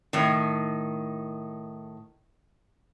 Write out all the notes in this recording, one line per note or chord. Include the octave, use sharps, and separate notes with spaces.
A2 D#3